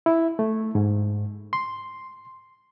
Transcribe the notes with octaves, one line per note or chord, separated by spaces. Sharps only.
E4
A3
G#2
C6